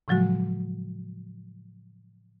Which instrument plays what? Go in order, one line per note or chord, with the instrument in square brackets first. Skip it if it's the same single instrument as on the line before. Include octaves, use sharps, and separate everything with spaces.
[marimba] A2 C#3 F3 F#3 G#3 F#4